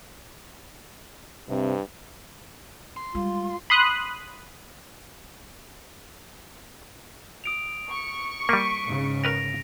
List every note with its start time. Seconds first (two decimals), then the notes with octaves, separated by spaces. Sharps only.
1.49 G2 C3
2.97 C6
3.15 G3 G#3 F4
3.70 B5 C6 D#6 F#6
7.44 D#6 D7 F7
7.91 C#6
8.49 G3 A#3 B6 D7 D#7
8.84 G#2 C#3
9.24 A#4 B4 G5 A#6 D7 F7